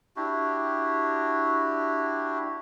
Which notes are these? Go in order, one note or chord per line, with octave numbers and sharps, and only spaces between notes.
D4 E4 F#4 G4